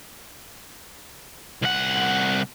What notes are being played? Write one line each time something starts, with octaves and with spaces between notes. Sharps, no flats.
C2 F#5